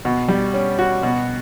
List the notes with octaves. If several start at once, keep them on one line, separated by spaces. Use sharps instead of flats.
B2
G3
C#4
F#4
B2